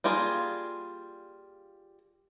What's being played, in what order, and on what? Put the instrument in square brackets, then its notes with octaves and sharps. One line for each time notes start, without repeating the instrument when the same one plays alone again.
[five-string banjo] G3 A#3 F4 G#4